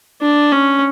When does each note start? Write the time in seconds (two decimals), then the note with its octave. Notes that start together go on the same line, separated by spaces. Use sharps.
0.21 D4
0.52 C#4